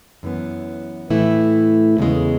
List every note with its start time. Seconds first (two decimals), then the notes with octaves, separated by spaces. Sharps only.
0.23 F#2 E3 B3
1.10 A2 E3 A3 E4
1.98 E2 C#3 G#3